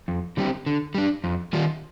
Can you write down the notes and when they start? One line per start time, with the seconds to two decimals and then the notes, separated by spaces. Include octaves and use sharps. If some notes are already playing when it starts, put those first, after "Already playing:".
0.08 F2
0.37 D3 G3 C4 G4
0.66 D3
0.95 G3 D4
1.24 F2
1.53 D#3 G3 A#3 F4